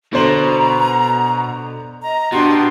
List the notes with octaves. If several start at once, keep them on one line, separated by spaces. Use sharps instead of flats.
B2 D3 C5 A#5 F#7
D#5 A#5
B2 D4 F#4 G4 C6